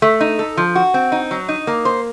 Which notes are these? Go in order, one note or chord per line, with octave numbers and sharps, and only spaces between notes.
A3
D#4
A4
F3
F#4
C4
D#4
F#3
D#4
A#3
C5